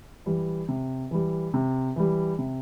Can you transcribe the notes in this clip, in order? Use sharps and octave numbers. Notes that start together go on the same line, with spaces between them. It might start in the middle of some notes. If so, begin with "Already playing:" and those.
E3 G3
C3
E3 G3
C3
E3 G3
C3